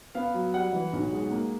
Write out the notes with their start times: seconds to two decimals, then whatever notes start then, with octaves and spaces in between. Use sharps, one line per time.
0.15 B3 F5
0.34 F#3
0.54 G3 F#5
0.73 E3
0.93 B1
1.12 G#3
1.31 A#3